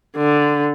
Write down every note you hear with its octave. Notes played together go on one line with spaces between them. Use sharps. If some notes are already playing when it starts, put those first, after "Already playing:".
D3